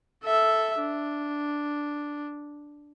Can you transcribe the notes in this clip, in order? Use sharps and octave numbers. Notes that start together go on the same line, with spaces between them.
A4 E5
D4